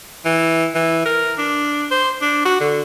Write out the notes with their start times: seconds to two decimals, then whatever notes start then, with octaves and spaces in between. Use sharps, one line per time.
0.25 E3
0.75 E3
1.05 A#4
1.38 D4
1.91 C5
2.21 D4
2.45 F#4
2.60 D3